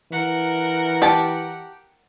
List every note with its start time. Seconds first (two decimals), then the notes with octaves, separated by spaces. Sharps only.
0.12 E3 A#4 F#5
1.02 G4 A5